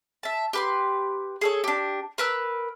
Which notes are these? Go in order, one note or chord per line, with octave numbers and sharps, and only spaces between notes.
E5 A5
G4 B4 C6
G#4 A4 C#5
D4 G4
A#4 B4 E6